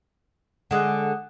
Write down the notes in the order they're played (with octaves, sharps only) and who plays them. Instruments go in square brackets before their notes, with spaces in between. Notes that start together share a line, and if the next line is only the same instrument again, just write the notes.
[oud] D3 G#3 [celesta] F#5 D#6 F#6